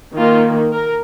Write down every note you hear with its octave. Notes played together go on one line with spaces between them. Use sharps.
D#3 A#3 F4
A#4